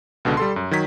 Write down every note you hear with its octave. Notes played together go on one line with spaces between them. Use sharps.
C#2 B2 D3
G3 A4 C6
F#2
D#3 F#3 G#6 B6